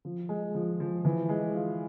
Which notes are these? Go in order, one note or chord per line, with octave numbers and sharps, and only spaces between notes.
F3
G#3
F3
F3
E3
G#3
F4